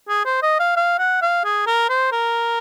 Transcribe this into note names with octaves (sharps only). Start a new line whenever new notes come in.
G#4
C5
D#5
F5
F5
F#5
F5
G#4
A#4
C5
A#4